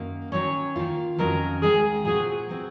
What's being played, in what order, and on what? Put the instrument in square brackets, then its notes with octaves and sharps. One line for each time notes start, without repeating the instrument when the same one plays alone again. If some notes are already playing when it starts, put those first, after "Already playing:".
Already playing: [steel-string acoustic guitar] F#2 D#3 A#3
[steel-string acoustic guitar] D#3 F#3 C#4 [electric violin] C#5
[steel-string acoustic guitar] D#3 A#3 F4
[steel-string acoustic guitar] F2 D#3 F#3 C#4 [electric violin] A#4
[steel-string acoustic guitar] D#2 D#3 G#3 [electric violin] G#4
[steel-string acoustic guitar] A#2 F#3 C4 F#4 [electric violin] G#4
[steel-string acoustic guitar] F#3 C4 F#4